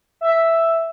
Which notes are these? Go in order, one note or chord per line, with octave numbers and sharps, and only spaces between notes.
E5